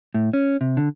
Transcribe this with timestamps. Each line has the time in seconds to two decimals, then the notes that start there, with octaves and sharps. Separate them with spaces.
0.14 A2
0.33 C#4
0.61 C3
0.77 D3